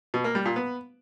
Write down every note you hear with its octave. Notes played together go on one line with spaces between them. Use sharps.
B2
A#3
G3
A#2
B3